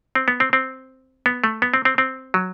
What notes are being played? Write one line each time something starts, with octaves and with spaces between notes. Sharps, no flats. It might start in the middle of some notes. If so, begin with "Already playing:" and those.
C4
B3
C4
C4
B3
A3
B3
C4
C4
C4
F#3